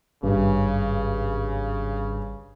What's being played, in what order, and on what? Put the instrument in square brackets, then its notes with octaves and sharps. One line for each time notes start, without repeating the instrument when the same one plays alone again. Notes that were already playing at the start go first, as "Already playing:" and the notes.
[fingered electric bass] G#1 [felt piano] G2 [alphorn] C#3